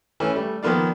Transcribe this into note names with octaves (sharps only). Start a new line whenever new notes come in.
E3 A3 C#4
G3 A3
D#3 F3 A#3 B3 F4 D5